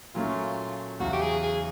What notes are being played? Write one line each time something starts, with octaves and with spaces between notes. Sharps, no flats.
A#2 F#3 A3 C#4 F4
E2 C#3 F#3 F#4
G4
G#4
G#4